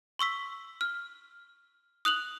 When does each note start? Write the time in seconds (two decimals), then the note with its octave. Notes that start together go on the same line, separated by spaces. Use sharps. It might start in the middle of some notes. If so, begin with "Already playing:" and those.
0.19 C6 C#6 E6 B6
0.81 F6
2.05 D#6 F#6 F7 F#7